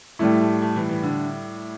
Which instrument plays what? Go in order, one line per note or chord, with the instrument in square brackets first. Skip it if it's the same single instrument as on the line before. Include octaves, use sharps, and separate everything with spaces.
[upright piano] A2 G3 E4 [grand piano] A3
[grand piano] A3
A3
E3
E3
D3